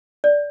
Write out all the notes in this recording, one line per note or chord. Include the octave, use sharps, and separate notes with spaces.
D5